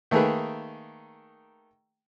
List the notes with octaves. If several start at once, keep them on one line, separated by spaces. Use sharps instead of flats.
D#3 A3 A#3 D#4 G#4 B4